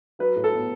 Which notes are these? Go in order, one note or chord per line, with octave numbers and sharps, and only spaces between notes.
F#3 B4
A2
A4
B3